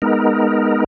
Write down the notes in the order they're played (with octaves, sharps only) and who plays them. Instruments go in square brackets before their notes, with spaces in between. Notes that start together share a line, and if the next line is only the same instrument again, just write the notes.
[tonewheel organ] G#3 B3 D#4 A#4